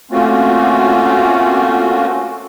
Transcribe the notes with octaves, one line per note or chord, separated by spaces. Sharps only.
A3 A#3 C4 C#4 F4 F#4